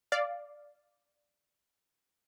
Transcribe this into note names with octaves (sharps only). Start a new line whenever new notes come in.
D5 F5